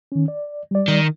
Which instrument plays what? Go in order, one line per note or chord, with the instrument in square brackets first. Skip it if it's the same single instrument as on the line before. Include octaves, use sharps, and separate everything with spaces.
[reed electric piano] D#3 C#4
D5
G3 D5
[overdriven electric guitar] D#3